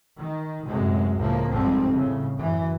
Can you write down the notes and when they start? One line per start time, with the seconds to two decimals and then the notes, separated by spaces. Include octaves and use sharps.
0.19 D#3
0.65 F#2 A2 C3 G#3
1.18 C#2 A2 F3 A#3
1.50 G#1 F2 G#2 F3 G3 C4
1.92 A2 C#3
2.38 F#2 E3